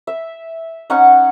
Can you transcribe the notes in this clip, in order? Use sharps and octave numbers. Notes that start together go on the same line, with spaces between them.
E5
C#4 D#4 F#5 C#6